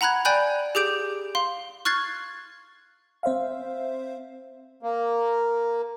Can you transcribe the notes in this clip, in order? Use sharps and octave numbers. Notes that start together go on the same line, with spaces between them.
F#5 A#5 B5 F#6 G#6
D5 G5 G#5 B5 F#6 G6
G4 G#4 D6 G6 D7
F5 C6
C#6 F6 F#6 G#6 A6 C7
C4 C5 E5 F5
A#3